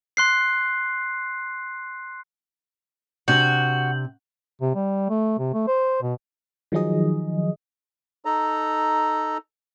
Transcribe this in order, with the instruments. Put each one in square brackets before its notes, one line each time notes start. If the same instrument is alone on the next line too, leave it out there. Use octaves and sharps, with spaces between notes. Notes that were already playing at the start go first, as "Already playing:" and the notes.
[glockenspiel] C6 F#6 C7
[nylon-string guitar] C3 D4 [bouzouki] F#4 [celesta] G6 F#7
[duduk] C3
G3
A3
C3
A3
C5
B2
[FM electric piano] D#3 F3 F#3 D#4 G#4 D#5
[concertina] D#4 A4 A#5